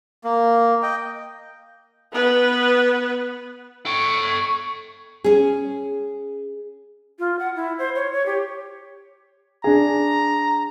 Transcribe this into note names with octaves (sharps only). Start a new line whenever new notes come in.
A#3
D#5 G5
B3 B4
A4 G5 C#6
C#4 G#4
F4
F#5
E4
C5
C#5
C#5
G4
D4 G#4 A#5